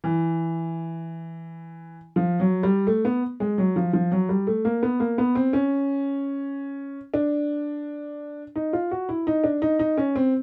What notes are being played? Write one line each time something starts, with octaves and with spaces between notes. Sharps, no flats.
E3
F3
F#3
G3
A3
B3
G#3
F#3
F3
F3
F#3
G3
A3
A#3
B3
A#3
B3
C4
C#4
D4
D#4
F4
F#4
E4
D#4
D4
D#4
D#4
C#4
C4